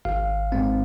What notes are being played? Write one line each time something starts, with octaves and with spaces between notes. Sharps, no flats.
G#1 F5
G#2 G#3 C4